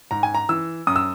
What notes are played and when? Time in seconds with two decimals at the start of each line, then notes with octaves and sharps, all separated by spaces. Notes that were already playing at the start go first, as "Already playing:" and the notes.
0.11 G#2 A#5
0.23 G#5
0.35 A#5
0.49 E3 E6
0.87 F#2 D#6
0.96 E6